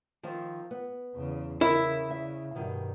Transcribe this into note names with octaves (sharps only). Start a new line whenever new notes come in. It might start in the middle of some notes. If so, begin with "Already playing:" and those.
D#3 F3 C4
B3
E2 C#3
C#3 E4 A#4
E5
G2 B2 D#3 G3